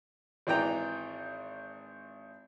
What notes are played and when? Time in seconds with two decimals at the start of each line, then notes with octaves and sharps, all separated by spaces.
0.47 G#1 E3 D5 G5 A#5